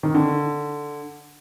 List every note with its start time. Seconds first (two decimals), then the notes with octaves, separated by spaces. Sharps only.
0.03 D#3
0.15 D3